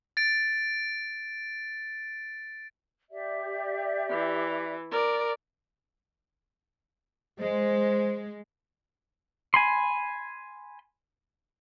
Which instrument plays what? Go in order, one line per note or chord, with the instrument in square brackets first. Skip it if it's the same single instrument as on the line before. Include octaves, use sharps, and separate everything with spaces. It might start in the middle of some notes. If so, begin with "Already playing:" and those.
[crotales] A6 D7
[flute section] G4 D5 E5
[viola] E3
A#4 D5
[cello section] G#3 [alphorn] C5
[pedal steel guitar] G#5 B5 C6